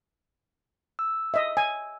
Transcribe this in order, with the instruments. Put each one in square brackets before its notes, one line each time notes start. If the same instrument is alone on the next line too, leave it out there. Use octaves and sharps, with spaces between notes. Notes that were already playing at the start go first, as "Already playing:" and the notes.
[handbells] E6
[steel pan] D#5 E5
G#5